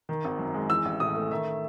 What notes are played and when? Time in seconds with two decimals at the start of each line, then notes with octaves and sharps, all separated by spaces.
0.09 D#3
0.25 G#1
0.39 F#2
0.54 G#3
0.69 E3 E6
0.85 A1
1.00 A2 D#6
1.16 A3
1.31 D#3 E5